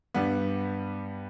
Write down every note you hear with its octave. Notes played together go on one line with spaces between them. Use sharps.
G2 G3 B3